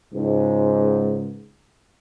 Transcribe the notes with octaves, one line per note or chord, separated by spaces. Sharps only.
C#2 G#2